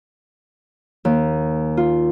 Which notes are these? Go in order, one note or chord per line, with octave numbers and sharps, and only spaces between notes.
D#2
F4